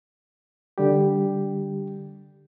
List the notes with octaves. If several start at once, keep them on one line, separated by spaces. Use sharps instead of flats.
D3 G3 G4